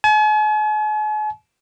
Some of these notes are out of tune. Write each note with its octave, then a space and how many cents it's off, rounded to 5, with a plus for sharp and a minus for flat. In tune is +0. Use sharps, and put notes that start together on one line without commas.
G#5 +45